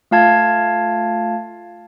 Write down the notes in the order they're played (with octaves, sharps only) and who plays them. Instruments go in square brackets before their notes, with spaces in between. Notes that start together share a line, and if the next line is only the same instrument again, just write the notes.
[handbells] A3 F4 F5 A5 G#6